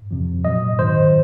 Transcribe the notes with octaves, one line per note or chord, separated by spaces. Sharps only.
F2 C3 F3
A#2 F#3 D#5
G#2 D#3 F#3 C5